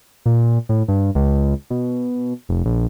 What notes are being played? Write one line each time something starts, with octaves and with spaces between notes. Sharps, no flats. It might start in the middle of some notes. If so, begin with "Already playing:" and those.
A#2
A2
G2
C#2
B2
F1
A#1